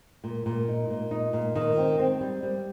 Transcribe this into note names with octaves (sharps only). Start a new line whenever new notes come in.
A#2
A#2
D#4
A#2
D#4
A#2
D#3
C4
C4
G3
G3